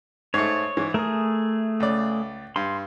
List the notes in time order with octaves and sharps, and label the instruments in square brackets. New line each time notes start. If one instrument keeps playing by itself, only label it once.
[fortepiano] G#2 A3 [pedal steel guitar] C#5
[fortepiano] G#2 E3
[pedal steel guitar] A3 G#4 [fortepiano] A#4
[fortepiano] C#2 D5
[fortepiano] G2 [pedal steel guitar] C6